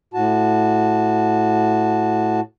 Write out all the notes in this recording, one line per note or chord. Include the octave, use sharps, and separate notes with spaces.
A2 F#4 A5